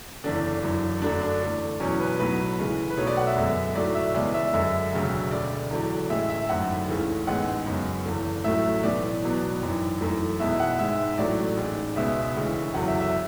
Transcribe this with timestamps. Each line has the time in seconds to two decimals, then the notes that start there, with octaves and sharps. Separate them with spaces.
0.24 F#1 E2 D3 D4
0.63 F#1 F#2 E3
1.02 F#2 D3 F#3 A3 D4
1.21 D4
1.41 E2 D3 A3
1.80 E2 B2 F#3 C#4
2.00 B4
2.19 B1 A2 F#3 B3 B4
2.59 D2 C#3 E3 G#3
2.90 B4
2.97 B1 B2 F#3 A3 C#5
3.07 D5
3.17 F#5
3.27 E5
3.36 F#2 D3 G#3 B3
3.75 B1 A2 F#3 A3 D5
3.95 E5
4.15 E2 C#3 G#3 B3 D5
4.34 E5
4.53 F#2 D3 G#3 E5
4.93 E1 D2 C#3 F#3
5.31 E1 D2 D3 D5
5.71 E2 D3 F#3
6.10 A1 A2 G#3 E5
6.30 E5
6.49 G#1 F#2 D3 A3 F#5
6.88 C#2 C#3 E3 A3
7.27 A1 G#2 G#3 B3 F#5
7.66 F#2 C#3 G#3 B3
8.05 F#1 E2 D3
8.44 A1 A2 F#3 A3 E5
8.83 B1 A2 E3 B3 D5
9.23 E2 B2 F#3 B3
9.61 G#1 F#2 E3
10.00 F#2 E3 A3
10.40 E2 B2 G#3 B3 E5
10.60 F#5
10.79 G#1 G#2 G#3 E5
11.18 A1 A2 F#3 A3 D5
11.56 A1 G#2 G#3
11.96 C#2 B2 G#3 B3 E5
12.35 E1 D2 C#3 E3 G#3
12.74 F#1 E2 D3 F#3 F#5
12.87 E5
13.00 E5